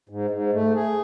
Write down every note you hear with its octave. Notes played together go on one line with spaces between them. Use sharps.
G#2
G#2
A3
G#4